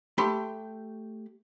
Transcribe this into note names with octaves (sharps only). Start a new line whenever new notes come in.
A3 G4 B5 C6